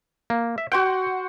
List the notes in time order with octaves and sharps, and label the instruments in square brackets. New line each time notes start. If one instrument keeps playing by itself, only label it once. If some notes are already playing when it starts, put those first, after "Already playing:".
[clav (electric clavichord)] A#3
E5
[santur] F#4 C5 F#5 [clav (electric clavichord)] G5